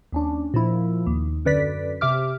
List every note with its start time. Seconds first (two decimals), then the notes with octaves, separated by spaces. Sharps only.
0.12 D#2 C#4 D4
0.54 A#2 F3 E4
1.06 D#2
1.45 F#2 D3 B4 D5 B6
2.01 C3 G4 E5 D6 F6